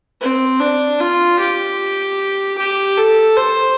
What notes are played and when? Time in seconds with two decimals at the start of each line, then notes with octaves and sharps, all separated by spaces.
0.21 C4
0.60 D4
1.00 F4
1.39 G4
2.58 G4
2.97 A4
3.37 C5